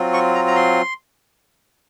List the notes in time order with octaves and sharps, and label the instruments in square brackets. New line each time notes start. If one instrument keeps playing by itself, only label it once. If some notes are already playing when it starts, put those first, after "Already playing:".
Already playing: [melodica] F#3 C4 F4
C#6
A#5
A#5
C6